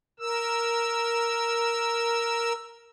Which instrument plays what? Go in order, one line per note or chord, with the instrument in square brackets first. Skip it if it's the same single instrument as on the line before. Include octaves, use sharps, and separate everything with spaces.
[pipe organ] A#4 E6